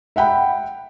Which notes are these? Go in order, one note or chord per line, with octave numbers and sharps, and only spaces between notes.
E5 F#5 G5 B5